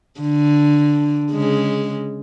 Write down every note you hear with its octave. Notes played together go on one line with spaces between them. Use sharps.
D3
C#3 G#3